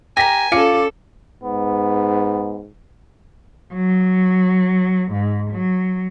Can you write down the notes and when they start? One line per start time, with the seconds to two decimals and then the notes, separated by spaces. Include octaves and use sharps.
0.17 G4 A#4 G#5 A#6 B6
0.52 C#4 F4 A4 D5 C#7
1.44 G#2 B3
3.73 F#3
5.10 G#2
5.49 F#3